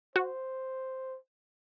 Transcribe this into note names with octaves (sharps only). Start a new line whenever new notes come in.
F#4 C5